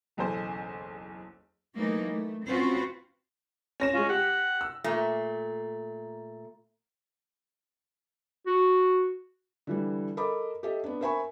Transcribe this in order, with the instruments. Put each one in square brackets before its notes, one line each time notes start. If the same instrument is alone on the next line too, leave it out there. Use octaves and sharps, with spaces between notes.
[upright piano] F#1 B1 E2 A4 C5
[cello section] E3 F#3 A3 A#3 D#4
A3
C4 C#4 F4 F#4 B4 C5
[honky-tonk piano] C#4 A#6 E7
[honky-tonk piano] G#3 F4 [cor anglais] C#4
[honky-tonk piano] G4 [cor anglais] F#5
[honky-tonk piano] E6
[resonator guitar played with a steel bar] A#2 A3
[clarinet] F#4
[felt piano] D3 E3 G3
A4 A#4 D#5 B5 D6
G4 A4 D#5 E5
B3 D4
A#4 C5 E5 G#5 B5 C#6